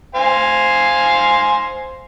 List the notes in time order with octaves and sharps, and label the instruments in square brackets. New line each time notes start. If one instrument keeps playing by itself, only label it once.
[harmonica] C5 F5 G#5